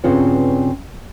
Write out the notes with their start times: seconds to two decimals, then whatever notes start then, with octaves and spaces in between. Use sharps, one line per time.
0.04 G2 C#3 B3 C4 F4 C#5